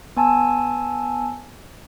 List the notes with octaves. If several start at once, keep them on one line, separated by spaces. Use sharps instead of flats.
B3 G#5 A5 E6